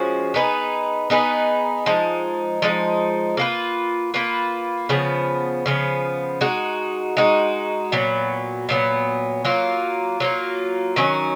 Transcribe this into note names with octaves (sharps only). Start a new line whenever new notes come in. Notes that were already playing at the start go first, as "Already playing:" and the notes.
Already playing: F3 G#3 C#4 F#4
B3 D#4 G#4 B4
B3 D#4 G#4 B4
F3 G#3 D#4
F3 G#3 D#4
A#3 F4 B4
A#3 F4 B4
C#3 F3 B3
C#3 F3 B3
G#3 D#4 F#4
G#3 D#4 F#4
A#2 F#3 B3
A#2 F#3 B3
F#3 A#3 F4
F#3 A#3 F4
D#3 F#3 C#4